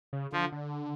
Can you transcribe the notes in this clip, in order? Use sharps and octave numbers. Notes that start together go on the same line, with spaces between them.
C#3
D3 F3
D3